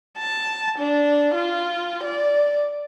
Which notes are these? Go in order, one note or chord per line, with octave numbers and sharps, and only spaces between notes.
A5
D4
F4
D5